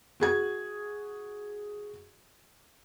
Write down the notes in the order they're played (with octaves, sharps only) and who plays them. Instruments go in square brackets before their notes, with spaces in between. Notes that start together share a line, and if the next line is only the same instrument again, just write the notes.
[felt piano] F#4 G#4 G#6